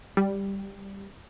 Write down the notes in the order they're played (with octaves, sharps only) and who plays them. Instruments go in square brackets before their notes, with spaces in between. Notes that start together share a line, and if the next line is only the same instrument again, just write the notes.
[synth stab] G3